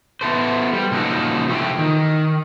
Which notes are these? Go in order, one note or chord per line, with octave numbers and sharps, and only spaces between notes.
B3 E4 A4 C5
G3
A#2 C#3 F3 D#4 F#4 A4
C3 F3 A3 E4 G4
D#3